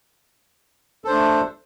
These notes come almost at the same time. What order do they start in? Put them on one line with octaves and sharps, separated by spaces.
A4 C5 D4 A3